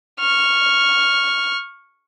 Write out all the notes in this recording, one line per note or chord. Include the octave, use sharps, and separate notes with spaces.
C#6 F6